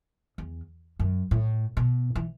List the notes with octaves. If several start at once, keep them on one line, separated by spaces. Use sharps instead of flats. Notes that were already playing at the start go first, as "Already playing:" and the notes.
E2
F#2
A2
B2
E3